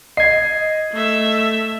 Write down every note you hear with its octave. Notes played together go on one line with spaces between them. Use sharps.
D#5 G#6 C7
A3 E5